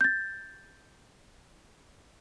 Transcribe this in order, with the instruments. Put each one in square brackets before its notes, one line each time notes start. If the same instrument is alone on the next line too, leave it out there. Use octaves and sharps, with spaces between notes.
[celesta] G6 A6